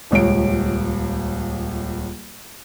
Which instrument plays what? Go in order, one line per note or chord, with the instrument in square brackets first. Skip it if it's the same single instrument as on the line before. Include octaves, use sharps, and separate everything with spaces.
[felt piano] D#1 C#2 C#5 D7